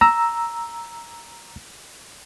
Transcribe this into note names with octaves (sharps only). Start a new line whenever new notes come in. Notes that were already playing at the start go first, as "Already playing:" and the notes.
A#5 E6